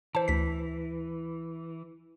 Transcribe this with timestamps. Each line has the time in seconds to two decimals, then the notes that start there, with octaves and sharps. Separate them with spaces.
0.15 E3 C5 A5
0.28 D2 B6